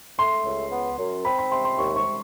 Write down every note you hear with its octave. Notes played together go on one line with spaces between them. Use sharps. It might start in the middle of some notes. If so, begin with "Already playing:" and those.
A3 C6
C#2
B3
F#2
C4 B5
B5
C3 C6
C6
D#2 C#6
C#6